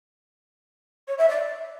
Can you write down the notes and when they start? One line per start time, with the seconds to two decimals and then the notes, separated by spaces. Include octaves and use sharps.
1.08 C#5
1.18 E5
1.29 D5